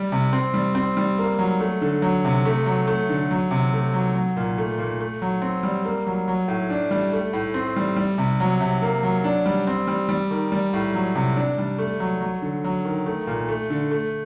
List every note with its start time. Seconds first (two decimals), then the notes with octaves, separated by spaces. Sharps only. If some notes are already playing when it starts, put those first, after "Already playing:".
Already playing: G3
0.12 C3
0.33 C4
0.54 G3
0.75 C4
0.97 G3
1.19 A#3
1.39 F#3
1.60 A3
1.82 D3
2.02 F#3
2.25 C3
2.45 A3
2.66 F#3
2.87 A3
3.10 D3
3.31 F#3
3.51 C3
3.73 A3
3.94 F#3
4.15 F#3
4.37 A#2
4.58 A3
4.78 A#2
5.00 A3
5.22 F#3
5.42 C4
5.63 G3
5.85 A#3
6.07 F#3
6.28 F#3
6.48 A2
6.70 D4
6.91 G3
7.13 A3
7.33 A2
7.54 C4
7.76 G3
7.96 G3
8.18 C3
8.40 F#3
8.61 C3
8.82 A#3
9.03 F#3
9.24 D4
9.46 G3
9.67 C4
9.87 G3
10.09 G3
10.31 D#3
10.52 G3
10.74 A2
10.94 F#3
11.16 C3
11.36 D4
11.58 G3
11.78 A3
12.00 F#3
12.21 F#3
12.42 D3
12.64 F#3
12.85 D#3
13.06 A3
13.27 A#2
13.48 A3
13.70 D3
13.91 A3